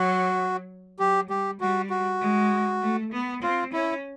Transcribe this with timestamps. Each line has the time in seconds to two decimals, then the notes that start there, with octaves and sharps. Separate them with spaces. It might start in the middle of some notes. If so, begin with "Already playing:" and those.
Already playing: F#3 F#4
0.99 F#3 G4
1.29 G3 G4
1.60 G3 F#4
1.90 F#4
2.21 G#3
2.82 A3
3.12 B3
3.42 C4 F4
3.73 C#4 E4